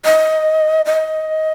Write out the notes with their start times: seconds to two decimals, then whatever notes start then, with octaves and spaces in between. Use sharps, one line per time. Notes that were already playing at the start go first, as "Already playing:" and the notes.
0.05 D#5
0.86 D#5